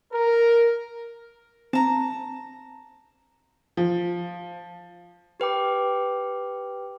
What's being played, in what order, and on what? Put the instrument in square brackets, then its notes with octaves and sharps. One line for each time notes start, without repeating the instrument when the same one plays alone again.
[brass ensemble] A#4
[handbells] C4 [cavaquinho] A5 A#5
[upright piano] F3
[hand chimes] G4 B4 G5 D6